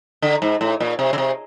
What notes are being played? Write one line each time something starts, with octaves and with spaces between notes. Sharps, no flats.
D3
G#2
A2
A#2
C3
C#3
C3